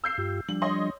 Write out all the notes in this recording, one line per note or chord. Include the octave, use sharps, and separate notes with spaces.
E6 G6 C7
G2 F4 G4
F3 G3 D4 F#7
C#5 D#5 C6